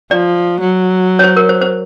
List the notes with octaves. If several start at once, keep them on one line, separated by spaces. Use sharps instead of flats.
F3 D5
F#3
C#5
C5
A#4
C5
C5